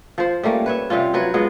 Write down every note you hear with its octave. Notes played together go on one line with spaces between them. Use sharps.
F3 C5
G3 A3 A#3 C#4
B4 C#5 E5
C3 G3 C#4 F4
F3 F#3 B4 C#5
F3 G#3 B3 C#4